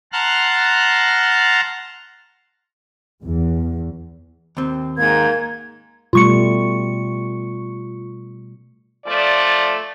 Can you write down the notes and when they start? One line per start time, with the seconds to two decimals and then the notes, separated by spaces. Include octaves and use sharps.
0.12 F#5 A5 A#5 C6 F6 F#6
3.24 E2
4.57 D#2 C4
4.98 G#2 A#3 G#6
6.13 B2 G3 A3 F4 C#6 C#7
9.06 F3 A3 D5